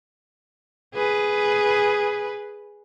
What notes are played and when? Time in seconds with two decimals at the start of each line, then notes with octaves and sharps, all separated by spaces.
0.94 G#4 B4